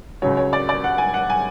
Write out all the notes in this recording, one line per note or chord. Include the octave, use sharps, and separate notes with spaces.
C#2 C#3 F#3 C#5
C#5
D5
D5
F#5
G#5
F#5
G#5